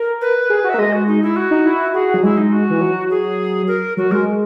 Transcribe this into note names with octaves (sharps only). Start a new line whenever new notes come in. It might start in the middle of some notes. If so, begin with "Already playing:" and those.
Already playing: A#4
B4
G#4
F#4
E5
A#3
G#3 D#5
F#4
D#4
E4
F#4
D#4
E4
F#4 G#4
F#3
G#3 E4
D#4
F#4
E3
F#3
G#4
A#4
F#3 F#4
G#3 A#4